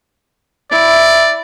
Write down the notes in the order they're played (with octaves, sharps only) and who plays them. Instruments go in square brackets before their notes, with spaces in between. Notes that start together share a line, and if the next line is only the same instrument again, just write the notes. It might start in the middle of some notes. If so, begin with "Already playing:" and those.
[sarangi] E4 [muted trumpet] D5